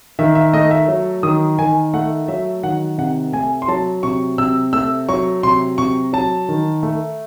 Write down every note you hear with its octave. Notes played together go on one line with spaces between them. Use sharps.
D#3 E5
E5
A3 D#5
E5
F#3
D#3 D#6
D#3 G#5
A3 F#5
F#3 E5
D#3 F#5
C3 F#5
A3 G#5
C6
F#3 A5
C3 C#6
C3 E6
A3 E6
F#3 C#6
C3 C6
C3 C#6
F#3 A5
D#3
A3